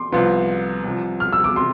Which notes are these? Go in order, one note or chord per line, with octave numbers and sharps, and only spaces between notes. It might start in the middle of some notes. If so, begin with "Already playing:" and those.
Already playing: C6 D6
C2 C3 F3 B3 F4 C6
C2 C3 F3
F6
E6
D6
C3 C6